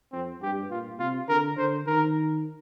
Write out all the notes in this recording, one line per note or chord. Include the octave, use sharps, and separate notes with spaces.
F2 C4
G2 G4
A#2 F4
C3 F4
D3 A#4
D3 C5
D#3 A#4